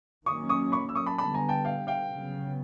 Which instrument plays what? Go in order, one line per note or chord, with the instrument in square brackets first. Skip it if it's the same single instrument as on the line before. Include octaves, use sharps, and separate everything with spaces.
[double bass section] D#3 F#3 A#3 C#4 [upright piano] C#6 D#6
[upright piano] C#6 D#6
B5 C#6
E6
C#6 D#6
A5 B5
[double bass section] D3 G3 B3 [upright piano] A5 B5
[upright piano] G#5 A#5
G5 A5
F5 G5
F5 G5
[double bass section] C#3 F#3 B3